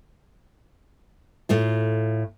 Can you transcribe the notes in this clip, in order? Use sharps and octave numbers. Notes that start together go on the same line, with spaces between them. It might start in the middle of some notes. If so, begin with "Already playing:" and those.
A2 A3 F4